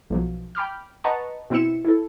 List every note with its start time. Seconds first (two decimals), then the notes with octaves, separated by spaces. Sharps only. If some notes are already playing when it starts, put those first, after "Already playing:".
0.10 B1 F3 F#3
0.55 G5 B5 D6 F6
1.04 B4 D#5 F#5 A5 A#5 C#6
1.50 B2 C4 E4 E5 C#7 E7
1.85 E4 A4